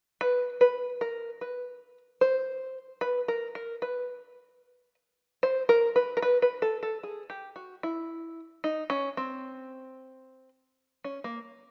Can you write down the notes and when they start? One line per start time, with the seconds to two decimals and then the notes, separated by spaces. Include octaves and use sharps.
0.21 B4
0.61 B4
1.01 A#4
1.41 B4
2.21 C5
3.01 B4
3.28 A#4
3.55 A#4
3.82 B4
5.43 C5
5.69 A#4
5.96 B4
6.17 A#4
6.22 B4
6.42 B4
6.62 A4
6.83 A4
7.03 G#4
7.30 G4
7.56 F#4
7.83 E4
8.64 D#4
8.90 C#4
9.17 C4
11.04 C#4
11.24 A#3